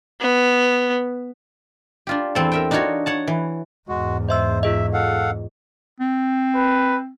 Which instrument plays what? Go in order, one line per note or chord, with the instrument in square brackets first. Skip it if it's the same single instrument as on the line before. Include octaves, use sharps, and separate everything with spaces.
[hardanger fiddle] B3
[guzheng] D4 F4 G4
E2 C4 A4
A#4 E5 G5
D4 D#4 F4 F#4 C#5
C#5 F#5 A5
E3
[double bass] E2 G#2 [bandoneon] G#3 F#4
[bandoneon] C5 [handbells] D#5 E5 E6
[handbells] F4 G#4 D#5 [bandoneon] E5
[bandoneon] A4 F5 F#5
[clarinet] C4
[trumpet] B4